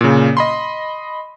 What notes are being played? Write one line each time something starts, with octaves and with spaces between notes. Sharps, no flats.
A#2 C#3
D#5 B5 C6